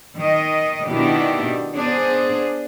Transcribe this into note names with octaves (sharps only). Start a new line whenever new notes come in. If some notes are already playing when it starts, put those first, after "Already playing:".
D#3 D#5
B2 D#3 B3 D4 E4 G4
B3 D4 G#4 C5